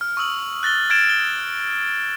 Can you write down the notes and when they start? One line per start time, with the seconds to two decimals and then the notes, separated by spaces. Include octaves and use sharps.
0.01 F6
0.17 C#6 D#6 E6 F#7
0.63 F#6 A6 A#6 G7
0.90 F6 G#6 A6 D7 E7
1.10 G7